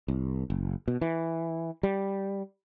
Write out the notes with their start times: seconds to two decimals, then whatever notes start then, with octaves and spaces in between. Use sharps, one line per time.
0.08 C2
0.50 F#1
0.88 B2
1.01 E3
1.83 G3